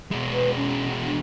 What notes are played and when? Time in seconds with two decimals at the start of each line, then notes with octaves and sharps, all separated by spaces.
0.11 B2 G#3
0.32 B4
0.56 C#4
1.05 D4